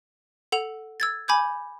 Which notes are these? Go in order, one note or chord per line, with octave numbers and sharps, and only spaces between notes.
A4 F#5 F7
E6 G#6 A6
G#5 B5 D6 G6 G#6